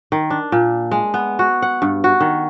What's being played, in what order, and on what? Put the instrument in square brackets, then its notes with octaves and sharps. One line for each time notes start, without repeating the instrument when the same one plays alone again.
[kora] D#3
D4
A#2
G#3
B3
F#4
F#5
G2
F#4
D#3